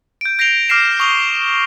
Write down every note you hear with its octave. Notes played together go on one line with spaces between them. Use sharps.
G6 D7
G6 A#6 C7 D7 F7 G7
D6 F6 A#6 C7 E7 F7
C#6 D#6 F7 G7